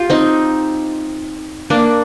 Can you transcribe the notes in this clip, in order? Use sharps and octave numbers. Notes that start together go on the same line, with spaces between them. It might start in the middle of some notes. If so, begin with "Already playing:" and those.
Already playing: F4 G4
C4 D#4
A#3 D4